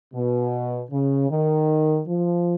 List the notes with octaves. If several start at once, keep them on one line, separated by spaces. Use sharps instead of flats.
B2
C#3
D#3
F3